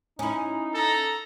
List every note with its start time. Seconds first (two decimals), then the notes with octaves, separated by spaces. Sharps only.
0.19 C#4 D#4 E4
0.75 A4 A#5